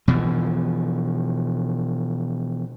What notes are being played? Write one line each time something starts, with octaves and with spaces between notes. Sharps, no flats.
B2 E3 F3